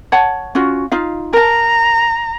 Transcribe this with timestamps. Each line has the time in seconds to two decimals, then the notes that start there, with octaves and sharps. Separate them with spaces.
0.12 C#5 F#5 A5
0.55 C#4 F4 F#4
0.92 D#4 F4 F5
1.33 A#4 A5 A#5